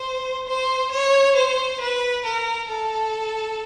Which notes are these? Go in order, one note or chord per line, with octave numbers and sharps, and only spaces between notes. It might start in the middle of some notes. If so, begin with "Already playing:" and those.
Already playing: C5
C5
C#5
C5
B4
A#4
A4